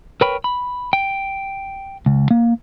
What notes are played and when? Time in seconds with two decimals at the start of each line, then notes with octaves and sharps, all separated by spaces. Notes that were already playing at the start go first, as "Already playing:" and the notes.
0.21 A#4 B4 C#5 G5 B5
0.44 B5
0.93 G5
2.06 C#2
2.31 A#3